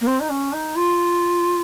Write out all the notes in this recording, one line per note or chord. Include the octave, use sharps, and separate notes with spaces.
A#3
C4
D#4
C#4
D#4
F4